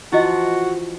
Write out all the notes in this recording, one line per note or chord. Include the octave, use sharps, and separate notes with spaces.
E3 F3 E4 F#4 D#5